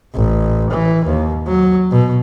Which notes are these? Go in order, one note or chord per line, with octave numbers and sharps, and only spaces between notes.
A1
E3
D#2
F#3
B2